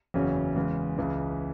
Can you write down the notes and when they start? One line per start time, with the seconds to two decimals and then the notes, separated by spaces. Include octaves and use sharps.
0.14 F#1 E2 C#3 F#3 C#4
0.56 E2 C#3 G#3
0.98 C#2 C#3 E3